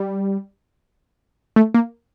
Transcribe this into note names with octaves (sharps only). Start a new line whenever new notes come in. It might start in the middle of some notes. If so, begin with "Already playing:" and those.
Already playing: G3
A3
A#3